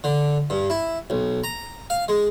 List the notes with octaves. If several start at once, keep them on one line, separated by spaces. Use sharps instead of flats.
D3
G2
E4
B1
A#5
F5
G#3